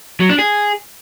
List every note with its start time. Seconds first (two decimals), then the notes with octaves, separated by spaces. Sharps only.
0.20 F#3
0.29 D4
0.39 G#4